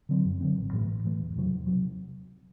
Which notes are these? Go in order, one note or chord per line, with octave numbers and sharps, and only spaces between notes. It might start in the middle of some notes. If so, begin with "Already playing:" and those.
D3 F#3 C4
F#2
D3 F#3 C4
A1
A2 E3 A3
A1
A2 E3 A3
E1
E2 C3 F#3
E1
C3 F#3